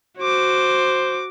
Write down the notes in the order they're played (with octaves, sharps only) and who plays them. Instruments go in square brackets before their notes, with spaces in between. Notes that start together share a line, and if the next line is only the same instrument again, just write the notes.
[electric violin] F#4 D6 [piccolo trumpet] C5